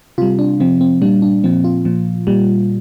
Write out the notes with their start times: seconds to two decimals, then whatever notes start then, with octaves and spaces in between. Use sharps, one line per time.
0.18 C3 G3 F4
0.39 D4
0.60 C3 F3 C4
0.81 C4
1.02 A#2 G3 D4
1.22 D4
1.44 A#2 F3 C4
1.64 F4
1.85 A#2 F3
2.27 A#2 G3